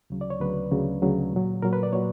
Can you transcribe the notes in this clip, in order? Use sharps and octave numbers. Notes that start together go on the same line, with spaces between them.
D2 C#3 F#3
D5
C#5
D2 C#3 F#3 B4
D2 C#3 F#3
D2 C#3 F#3
A#2 F#3
A#2 F#3 A#4
B4
D5
A#2 F#3 C#5